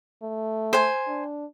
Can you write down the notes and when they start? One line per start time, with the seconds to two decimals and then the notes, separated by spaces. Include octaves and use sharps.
0.23 A3
0.73 C5 G#5
1.07 D4